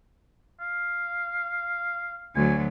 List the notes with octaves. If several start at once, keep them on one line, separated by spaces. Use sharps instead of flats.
F5
D2 F#3 G#5